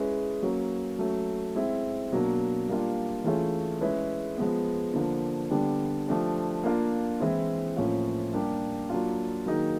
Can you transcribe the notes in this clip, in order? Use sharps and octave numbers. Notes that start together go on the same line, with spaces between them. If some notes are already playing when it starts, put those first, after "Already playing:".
Already playing: G#3 C#4 E4 G#4 B4
F#3 A#3 C#4
F#3 A3 C#4
G#3 C4 E4
B2 F#3 A#3 D4
G3 A#3 D4 F4
E3 A3 C#4 F4 G#4
G#3 C#4 E4 G#4 B4
F3 G#3 B3
D3 F3 A#3 D4
D3 G3 B3 D4 G4
F3 A3 D4 G4
A#3 D4 F4
E3 G#3 C4 E4
A2 F3 A#3 C#4 F4
G3 A#3 D4 G4
F#3 A#3 D4 F4
D#3 F#3 A#3 D#4 G#4